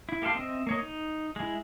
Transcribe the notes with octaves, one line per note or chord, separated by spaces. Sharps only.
E4
A#3 G4 A4 F5 C6
C4 D#5 E5
A#3 C#5 D#5
D#4
G#3 E4